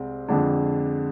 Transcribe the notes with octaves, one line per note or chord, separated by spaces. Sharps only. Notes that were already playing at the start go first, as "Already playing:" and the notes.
Already playing: C2 G#3 C4
F2 D3 G#3 D4